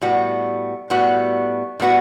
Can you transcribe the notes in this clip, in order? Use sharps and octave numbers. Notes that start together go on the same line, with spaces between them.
A2 G3 B3 F#4
A2 G3 B3 F#4
A2 G3 B3 F#4